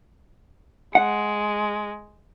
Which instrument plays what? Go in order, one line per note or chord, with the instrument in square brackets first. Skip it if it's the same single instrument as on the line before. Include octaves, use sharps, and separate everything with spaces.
[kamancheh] G#3 [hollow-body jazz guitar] F#5